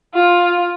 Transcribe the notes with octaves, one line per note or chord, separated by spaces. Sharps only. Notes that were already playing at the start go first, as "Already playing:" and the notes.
F4